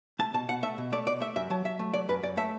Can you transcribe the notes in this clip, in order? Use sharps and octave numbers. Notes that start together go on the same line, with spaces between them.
A3 A5
B2 A5
B2 F#5
A3 E5
B2
A3 D5
B2 D5
A3 E5
F#2 E5
F#3 A5
F#3 E5
A3
F#3 D5
F#2 B4
F#2 D5
A3 E5